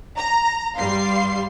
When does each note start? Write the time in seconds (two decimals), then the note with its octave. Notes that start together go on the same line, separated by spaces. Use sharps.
0.18 A#5
0.78 G2 G3 F5 C6 C7